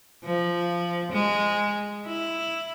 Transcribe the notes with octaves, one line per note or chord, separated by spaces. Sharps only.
F3
G#3
E4